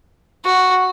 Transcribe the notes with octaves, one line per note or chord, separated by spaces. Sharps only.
F#4